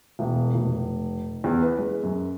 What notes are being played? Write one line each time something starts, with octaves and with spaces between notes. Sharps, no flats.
E1
F1
E2
B4
G#3
F#2